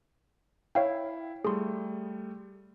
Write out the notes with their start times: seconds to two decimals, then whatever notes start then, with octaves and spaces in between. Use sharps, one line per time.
0.75 E4 C#5 F5 G5
1.45 G3 A3 G#4 C6